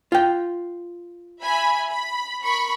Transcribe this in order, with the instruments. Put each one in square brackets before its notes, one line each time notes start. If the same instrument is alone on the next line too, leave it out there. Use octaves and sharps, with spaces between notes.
[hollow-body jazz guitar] F4 G5
[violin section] E5 G#5 B5
B5
A#4 B5 C#6